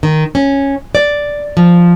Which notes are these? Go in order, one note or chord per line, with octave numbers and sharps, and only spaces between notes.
D#3
C#4
D5
F3